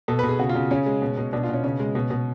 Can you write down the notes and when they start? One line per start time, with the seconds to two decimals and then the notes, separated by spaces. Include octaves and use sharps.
0.08 B2 A4
0.19 B4
0.23 B2
0.29 G#4
0.39 C#3 F#4
0.49 F4
0.55 C#3
0.71 C#3 C#4
0.86 G#3
1.02 B2
1.18 B2
1.33 B2 D4
1.43 F4
1.49 B2 C#4
1.64 C#3 C#4
1.80 G#3
1.95 B2
2.10 B2